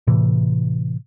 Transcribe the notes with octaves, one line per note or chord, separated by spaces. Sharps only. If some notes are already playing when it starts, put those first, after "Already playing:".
A2 C3 E3